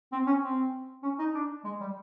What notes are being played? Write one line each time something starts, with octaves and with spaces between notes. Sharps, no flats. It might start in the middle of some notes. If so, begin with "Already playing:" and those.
C4
C#4
C4
C#4
D#4
D4
G#3
G3